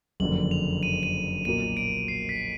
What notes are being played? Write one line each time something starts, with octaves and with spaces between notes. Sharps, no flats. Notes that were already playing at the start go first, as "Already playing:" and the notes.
F#1 F2 D3 F#7
F7
D#7
D#7
B1 A#2 F#3 A#3 D#7
D7
C7
B6